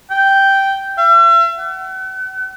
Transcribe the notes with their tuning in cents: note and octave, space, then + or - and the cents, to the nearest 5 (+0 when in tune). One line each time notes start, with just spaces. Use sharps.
G5 -5
E5 +40
F#5 +40